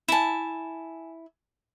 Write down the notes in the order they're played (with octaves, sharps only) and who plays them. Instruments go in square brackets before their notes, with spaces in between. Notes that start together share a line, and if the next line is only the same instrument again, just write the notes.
[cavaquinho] E4 A5 [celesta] G#5 E7